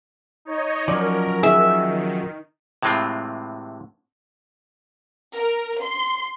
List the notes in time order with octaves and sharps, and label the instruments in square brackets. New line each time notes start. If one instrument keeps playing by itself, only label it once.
[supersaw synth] D#4 C#5 D#5
[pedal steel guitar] F3 F#3 C#4 [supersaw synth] A#4 [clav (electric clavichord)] D5
[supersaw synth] D#3 [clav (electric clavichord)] G#4 [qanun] E5
[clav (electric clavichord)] A2 C3 E3 G#3 C4 F4
[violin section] A#4
C6